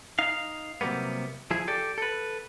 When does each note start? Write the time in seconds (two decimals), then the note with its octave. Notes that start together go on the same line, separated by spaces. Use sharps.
0.19 D#4 F5
0.81 C3 F#3 G3 A#3 B3
1.51 F3 E4 G#4
1.68 G4 A4 D5
1.98 A4 B4